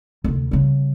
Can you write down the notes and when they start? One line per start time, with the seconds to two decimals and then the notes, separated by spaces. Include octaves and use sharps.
0.24 D2 C3
0.51 C#3 G3